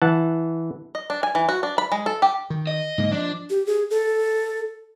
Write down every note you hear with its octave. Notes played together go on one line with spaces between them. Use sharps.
E3 F#5 A5
D#5
D4
G#5
E3
F#4
D4
B5
G#3
A4
G4
D#3
D#5
G#2 D3 A#3
F3 D4
G4
G#4
A4